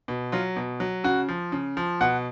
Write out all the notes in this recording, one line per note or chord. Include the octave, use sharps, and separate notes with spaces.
B2
F#3 F4
B2
F#3
C#3 F#4
F3
C#3
F3
B2 F#5